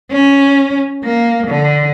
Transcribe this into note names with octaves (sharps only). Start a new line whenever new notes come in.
C#4
A#3
D3